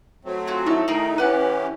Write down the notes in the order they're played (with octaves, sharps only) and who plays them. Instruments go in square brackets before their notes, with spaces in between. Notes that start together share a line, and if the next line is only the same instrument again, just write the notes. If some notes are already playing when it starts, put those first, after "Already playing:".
[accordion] F#3 A3 C4
[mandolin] F4 F#4 G#4
[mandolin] D#4 A4 C#6 [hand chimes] E4 E5
[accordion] D#3 A3 D#4 [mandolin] G#4 A#4 G5
[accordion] E3 C#4 G4 [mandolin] B4 D5 F#5